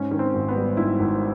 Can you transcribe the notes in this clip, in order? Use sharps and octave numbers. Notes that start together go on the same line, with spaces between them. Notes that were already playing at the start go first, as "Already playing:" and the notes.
Already playing: G#2 C#4
D#3
C4
G#1
B3
G3
G#2 E4
G#1